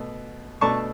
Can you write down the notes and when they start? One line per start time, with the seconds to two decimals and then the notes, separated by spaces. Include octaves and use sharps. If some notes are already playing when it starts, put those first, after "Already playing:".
Already playing: B2 A3
0.61 B2 A3 D4 A5 C#6